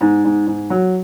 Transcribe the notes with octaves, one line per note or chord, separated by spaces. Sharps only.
G#2
G#2
G#2
F#3